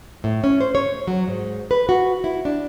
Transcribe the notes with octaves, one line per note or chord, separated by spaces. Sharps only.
A2
C#4
C5
C#5
F#3
G#2
B4
F#4
E4
D4